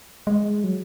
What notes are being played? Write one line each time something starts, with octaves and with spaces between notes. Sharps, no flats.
G#3
F#3